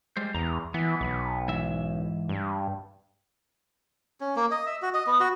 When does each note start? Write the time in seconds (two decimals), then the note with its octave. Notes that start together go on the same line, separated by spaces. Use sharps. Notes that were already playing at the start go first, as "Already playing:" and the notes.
0.17 G3 G#3 C5
0.34 E2 A#5
0.74 E3 B3
1.01 B1
1.48 G#2 E3 E5
2.29 G2
4.21 C#4
4.36 A#3
4.51 D#5
4.66 E5
4.82 F#4
4.94 D#5
5.07 B3
5.20 F#4